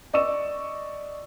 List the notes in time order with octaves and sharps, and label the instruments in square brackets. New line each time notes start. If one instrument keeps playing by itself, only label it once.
[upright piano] D5 D#5 C#6 E6 E7